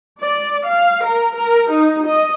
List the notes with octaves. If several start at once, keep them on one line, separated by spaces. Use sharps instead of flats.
D5
F5
A#4
A#4
D#4
D#5